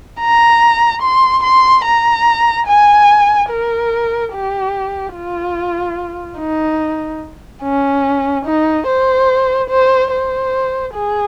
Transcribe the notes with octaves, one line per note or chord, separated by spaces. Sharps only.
A#5
C6
C6
A#5
G#5
A#4
G4
F4
D#4
C#4
D#4
C5
C5
C5
G#4